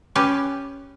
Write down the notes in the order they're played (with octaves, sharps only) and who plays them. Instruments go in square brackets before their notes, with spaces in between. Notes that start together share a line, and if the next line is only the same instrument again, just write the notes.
[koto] C#4 G4 B4